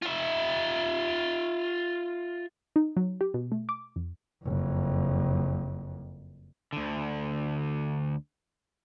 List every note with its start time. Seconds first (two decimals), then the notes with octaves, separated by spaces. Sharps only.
0.03 F4 E5
2.76 D#4
2.97 F#3
3.21 G4
3.34 B2
3.52 A3
3.69 D6
3.96 F2
4.44 F#1 F2
6.73 D2 D3